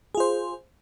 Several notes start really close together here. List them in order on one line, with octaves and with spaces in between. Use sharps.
G#4 F4 C5